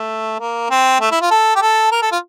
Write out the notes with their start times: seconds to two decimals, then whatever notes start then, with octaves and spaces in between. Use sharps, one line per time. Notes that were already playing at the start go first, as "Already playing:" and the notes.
Already playing: A3
0.40 A#3
0.70 C4
1.01 A3
1.11 E4
1.21 F4
1.31 A4
1.56 G4
1.62 A4
1.92 A#4
2.02 A4
2.12 F4